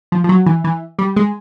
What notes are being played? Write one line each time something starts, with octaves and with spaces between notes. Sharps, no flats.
F3
F3
F#3
E3
E3
G3
G#3